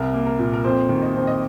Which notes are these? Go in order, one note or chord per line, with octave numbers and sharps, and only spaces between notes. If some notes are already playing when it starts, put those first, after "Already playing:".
Already playing: C2 A#4
A#3
A#4
A#2
A#4
F2 C5
D#3
D#5
F2 C5
D#5